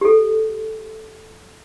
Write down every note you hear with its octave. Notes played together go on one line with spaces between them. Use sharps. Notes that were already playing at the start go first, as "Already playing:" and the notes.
G4 A4